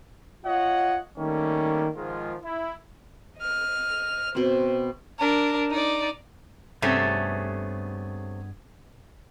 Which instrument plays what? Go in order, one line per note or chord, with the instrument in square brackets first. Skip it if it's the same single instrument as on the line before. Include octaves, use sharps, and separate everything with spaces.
[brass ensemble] F4 C#5 D#5 F#5
D#3 G3 A3 A#3 C#4
G#2 D#3 F3 G#3 F4
E4
[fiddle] D#5 F6
[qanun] B2 C4 [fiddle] B4 C5
[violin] D4 A#4
D#4 D5
[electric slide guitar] G2 B3 G#4 [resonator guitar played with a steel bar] C3 A3 C#4